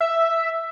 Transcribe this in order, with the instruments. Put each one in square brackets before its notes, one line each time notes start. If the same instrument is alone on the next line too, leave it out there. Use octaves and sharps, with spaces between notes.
[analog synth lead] E5